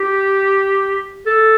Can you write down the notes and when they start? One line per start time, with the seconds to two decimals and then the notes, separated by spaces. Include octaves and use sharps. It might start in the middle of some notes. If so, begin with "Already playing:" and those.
Already playing: G4
1.26 A4